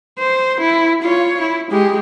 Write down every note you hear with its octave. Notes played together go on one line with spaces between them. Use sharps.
C5
E4
F4 C#5
E4
G#3 G4